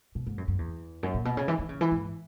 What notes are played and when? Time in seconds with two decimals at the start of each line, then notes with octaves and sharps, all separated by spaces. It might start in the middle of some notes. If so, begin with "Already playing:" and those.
0.15 B2
0.26 G#2
0.38 F#2
0.48 F#2
0.59 E2
1.03 F#2
1.14 A#2
1.25 B2
1.37 C#3
1.48 E3
1.59 D#3
1.69 C#3
1.81 E3
1.91 G#2